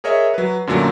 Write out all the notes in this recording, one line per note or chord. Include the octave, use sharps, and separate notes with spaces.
G#4 A#4 C#5 D#5 E5
F#3 B4
F#2 A#2 D3 F#3 A3